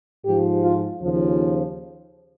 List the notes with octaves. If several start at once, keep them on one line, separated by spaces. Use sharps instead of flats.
G#2 F3 G4
F4
D#2 C#3 F3